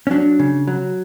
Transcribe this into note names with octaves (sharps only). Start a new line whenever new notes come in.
C#4
F#3 D4
C#3
F#3